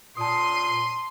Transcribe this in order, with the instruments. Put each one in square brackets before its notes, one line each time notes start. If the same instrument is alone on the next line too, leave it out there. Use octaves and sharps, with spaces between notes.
[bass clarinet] A#2 [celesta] A5 D#6 [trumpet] C6 [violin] C7 D#7